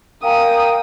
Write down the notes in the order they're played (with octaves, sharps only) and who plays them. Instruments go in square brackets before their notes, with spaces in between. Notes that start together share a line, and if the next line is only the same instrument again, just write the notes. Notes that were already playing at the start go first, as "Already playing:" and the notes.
[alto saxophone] A#4 [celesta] F5 G#5 A#5 [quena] G5 [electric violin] D#6